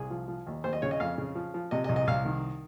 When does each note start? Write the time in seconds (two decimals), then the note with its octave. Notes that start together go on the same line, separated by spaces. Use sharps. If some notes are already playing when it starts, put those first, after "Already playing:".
Already playing: C2 G#4
0.10 F3
0.28 F3
0.47 D#2
0.64 D#2 C5
0.73 D#5
0.82 C#3 C#5
0.91 D#5
1.00 F2 F5
1.18 C#3
1.35 F3
1.54 F3
1.71 C3 D#5
1.84 D#5
1.89 C2
1.96 D#5
2.07 C2 F5
2.25 D#3